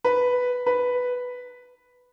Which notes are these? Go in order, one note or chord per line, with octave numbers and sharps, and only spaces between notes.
B4
B4